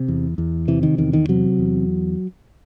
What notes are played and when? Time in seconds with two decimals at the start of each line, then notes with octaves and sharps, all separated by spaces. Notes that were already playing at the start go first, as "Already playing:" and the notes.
Already playing: C3
0.08 E2
0.38 E2
0.68 C3 E3
0.83 D#3
0.98 E2 D#3
1.13 D#3
1.29 C3 F#3
1.59 E2